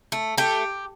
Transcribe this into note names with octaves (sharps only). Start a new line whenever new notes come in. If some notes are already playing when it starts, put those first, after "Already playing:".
A3
A3 G4